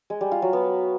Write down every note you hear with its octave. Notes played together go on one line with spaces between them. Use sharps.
G#3
G3
F4
F#3
B3